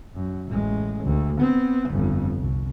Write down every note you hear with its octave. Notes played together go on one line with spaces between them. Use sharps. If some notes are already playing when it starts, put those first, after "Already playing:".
F#2
A1 G#3
D2
B3 C4
G1 F2
C2